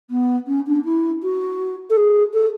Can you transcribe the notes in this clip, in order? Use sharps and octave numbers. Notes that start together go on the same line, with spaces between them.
B3
C#4
D4
E4
F#4
A4
G#4
A4